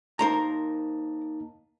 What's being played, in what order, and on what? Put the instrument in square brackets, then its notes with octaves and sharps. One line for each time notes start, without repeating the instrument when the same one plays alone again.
[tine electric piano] A#3 D#4 A5 [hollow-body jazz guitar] A#4 C5 A#5